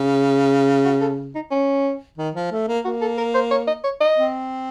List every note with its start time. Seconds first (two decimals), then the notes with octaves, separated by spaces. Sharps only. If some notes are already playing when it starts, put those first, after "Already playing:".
Already playing: C#3
0.85 F#4
1.01 A4
1.35 D#4
1.51 C#4
2.18 D#3
2.35 F3
2.51 A3
2.68 A#3
2.84 A#3 F#4
3.01 A4
3.18 A#4
3.34 C5
3.51 C#5
3.67 D#5
3.84 C#5
4.00 D#5
4.17 C4